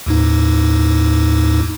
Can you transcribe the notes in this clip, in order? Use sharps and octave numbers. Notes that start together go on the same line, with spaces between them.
D#2 A2 D#4